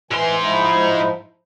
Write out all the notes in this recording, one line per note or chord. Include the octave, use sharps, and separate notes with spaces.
G#2 E3 G#5 C6
F3 D#4 E4